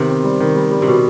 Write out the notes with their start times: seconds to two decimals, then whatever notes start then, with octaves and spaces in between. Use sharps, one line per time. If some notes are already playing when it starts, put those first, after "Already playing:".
Already playing: C3 D#3 B3
0.09 C4
0.24 G3
0.40 D#3
0.56 G3
0.71 G3
0.82 C3
0.87 B2